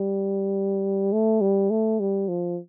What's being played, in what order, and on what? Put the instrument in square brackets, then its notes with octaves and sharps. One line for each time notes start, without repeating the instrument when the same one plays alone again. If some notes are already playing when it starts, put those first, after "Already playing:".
Already playing: [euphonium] G3
A3
G3
A3
G3
F3